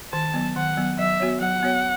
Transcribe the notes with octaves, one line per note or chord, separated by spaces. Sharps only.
D#3 A5
F#3 B3
D#3 F#5
F#3 B3
F#3 E5
B3 F#4 C#5
F#3 F#5
B3 F#4 C#5